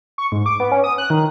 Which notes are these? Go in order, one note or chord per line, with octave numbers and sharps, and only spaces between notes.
C#6
G#2
D6
B3
C#4
D#6
F#6
D#3